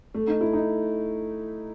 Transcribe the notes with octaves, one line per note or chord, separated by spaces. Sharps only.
A3
D#4
E4
D#4